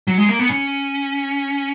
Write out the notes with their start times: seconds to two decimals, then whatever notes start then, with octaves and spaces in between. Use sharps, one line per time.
0.08 F#3
0.18 G#3
0.29 A#3
0.39 B3
0.50 C#4